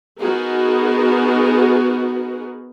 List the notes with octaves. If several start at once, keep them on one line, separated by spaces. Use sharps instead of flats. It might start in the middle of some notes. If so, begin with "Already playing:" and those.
B3 D#4 F#4 G#4 A#4